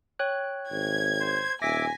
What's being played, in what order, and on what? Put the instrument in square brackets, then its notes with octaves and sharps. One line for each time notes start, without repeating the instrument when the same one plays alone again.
[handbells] C#5 G5 F#6
[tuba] G#1 [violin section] G#6
[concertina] C5
[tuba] D#1 [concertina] E5 D6 [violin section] G#5 [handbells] A#6 B6